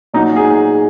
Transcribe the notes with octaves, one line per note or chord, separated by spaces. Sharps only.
A#2 F#3 D#4
G#4